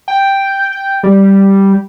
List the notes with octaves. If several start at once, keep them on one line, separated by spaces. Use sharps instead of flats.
G5
G5
G3